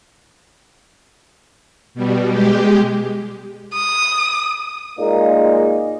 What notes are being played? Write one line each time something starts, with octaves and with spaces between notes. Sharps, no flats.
B2 G3
G#3 G4
D#6
A#2 G#3 A#3 D#4